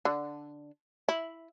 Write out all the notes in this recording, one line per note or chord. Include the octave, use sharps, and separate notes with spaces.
D3
E4